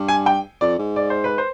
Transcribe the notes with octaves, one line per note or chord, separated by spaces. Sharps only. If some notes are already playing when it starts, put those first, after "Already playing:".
Already playing: G2
G#5
G5
F2 D5
G#2
D5
C5
B4
C5